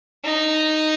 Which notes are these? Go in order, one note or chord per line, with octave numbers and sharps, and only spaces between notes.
D#4